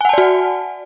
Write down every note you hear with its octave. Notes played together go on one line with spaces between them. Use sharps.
F#4 D5 F#5 G#5 A5